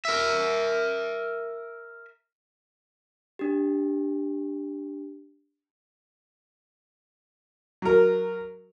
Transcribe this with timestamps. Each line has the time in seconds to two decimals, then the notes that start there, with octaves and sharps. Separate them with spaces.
0.05 A#4 E5
3.39 D4 G4
7.82 F#3 A#4